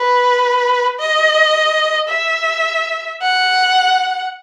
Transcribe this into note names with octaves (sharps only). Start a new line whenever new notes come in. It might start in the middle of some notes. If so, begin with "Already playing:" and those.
Already playing: B4
D#5
E5
F#5